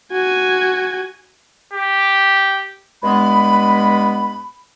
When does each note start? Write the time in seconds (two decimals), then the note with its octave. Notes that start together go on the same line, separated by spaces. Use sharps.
0.13 F#4 G#5
1.74 G4
3.03 G2 G#3 B3 B5